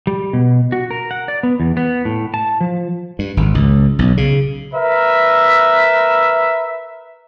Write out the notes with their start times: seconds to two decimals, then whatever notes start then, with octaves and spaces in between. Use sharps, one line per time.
0.07 G3
0.33 B2
0.72 F#4
0.91 A#4
1.11 F#5
1.28 D5
1.43 B3
1.60 E2
1.77 B3
2.05 A2
2.34 A5
2.61 F3
3.19 G2
3.37 G#1
3.55 C#2
3.99 B1
4.17 C#3
4.73 A#4 B4 E5